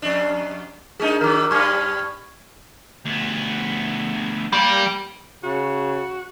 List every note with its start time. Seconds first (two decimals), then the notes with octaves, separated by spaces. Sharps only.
0.02 F2 D4
1.00 G#3 A#3 D4 D#4 G#4
1.21 D#3 F#3 A#4 D6
1.51 F#2 G3 C#6 F6 G#6
3.06 D2 B3
4.53 G3 A#3
5.43 C#3 F#4